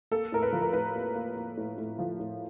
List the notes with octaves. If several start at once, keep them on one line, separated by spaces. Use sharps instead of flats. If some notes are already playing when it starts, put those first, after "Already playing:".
A#3 A4
A2 A#4
B4
F3
A#4
A2 B4
A#3
A#3
A#3
A2
A2
F3
A2